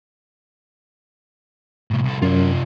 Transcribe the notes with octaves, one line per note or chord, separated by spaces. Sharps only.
A2 C3
C2 A4
F#2 C3 F4